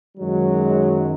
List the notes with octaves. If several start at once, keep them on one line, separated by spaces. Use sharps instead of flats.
F#2 D#3 F#3 G#3